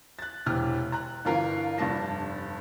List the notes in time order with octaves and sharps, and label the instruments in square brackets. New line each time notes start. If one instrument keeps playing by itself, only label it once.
[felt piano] F#6 A6
E1 C3 E3 F6
A#5 F#6
G1 E3 F4 A#4 F5
F1 G2 D4 A5 A#6